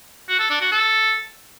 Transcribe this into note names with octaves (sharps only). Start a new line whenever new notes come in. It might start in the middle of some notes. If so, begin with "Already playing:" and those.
F#4
A4
D4
F#4
A4